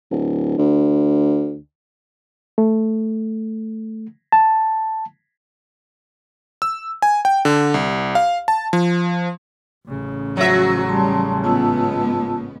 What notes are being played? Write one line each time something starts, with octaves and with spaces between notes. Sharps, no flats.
D1
D2
A3
A5
E6
G#5
G5
D3
C2
F5
A5
F3
A1 C#3
F3 F#3 F#4 E5 A#5
G3 A5 C6
G#2 G#3 B3 F4 A5 E6